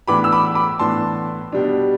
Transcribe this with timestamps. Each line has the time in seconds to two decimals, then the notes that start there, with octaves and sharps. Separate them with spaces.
0.08 A2 E3 B3 D4 B5 D6
0.24 E6
0.32 B5 D6
0.55 B5 D6
0.79 A2 E3 B3 D4 A5 C6
1.52 B2 G3 D4